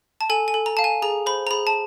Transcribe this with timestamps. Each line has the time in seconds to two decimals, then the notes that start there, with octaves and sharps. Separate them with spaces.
0.21 A5
0.30 A4 G#5
0.48 G#5
0.54 A4
0.66 A#5
0.77 F5 A5
0.84 G#5
1.02 G#4 A#5
1.26 C5 B5
1.47 A#5
1.51 G#4 B5
1.67 A5